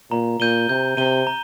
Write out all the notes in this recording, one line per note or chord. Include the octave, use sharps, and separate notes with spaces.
A#2 A#5
A#2 G6 D#7 G7
C3 G6
C3 D#7 G7
A#5